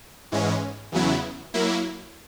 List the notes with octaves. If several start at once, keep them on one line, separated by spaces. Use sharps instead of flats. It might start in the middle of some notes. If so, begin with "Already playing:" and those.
G#2 E3 G#3 C#4
E2 C#3 F#3 B3 E4
F#3 A#3 E4